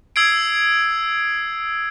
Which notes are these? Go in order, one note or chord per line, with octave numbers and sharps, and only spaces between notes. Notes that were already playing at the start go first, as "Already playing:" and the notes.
D#6 E6 G#6 C7 D7